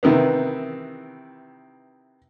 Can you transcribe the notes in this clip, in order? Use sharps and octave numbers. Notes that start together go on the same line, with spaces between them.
C3 D#3 E3 B3